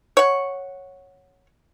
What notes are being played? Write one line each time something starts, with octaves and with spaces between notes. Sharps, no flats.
C#5 F#5